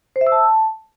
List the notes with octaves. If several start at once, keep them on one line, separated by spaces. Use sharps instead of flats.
C5
E5
E6
A5